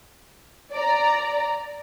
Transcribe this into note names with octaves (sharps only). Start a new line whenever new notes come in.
D5 A#5